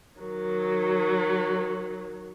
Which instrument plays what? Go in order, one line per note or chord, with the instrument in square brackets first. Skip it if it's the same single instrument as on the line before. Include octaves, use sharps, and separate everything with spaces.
[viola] D#3 F#3